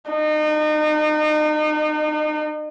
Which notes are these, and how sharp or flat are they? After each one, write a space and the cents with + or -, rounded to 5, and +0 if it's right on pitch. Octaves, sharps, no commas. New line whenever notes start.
D#4 -35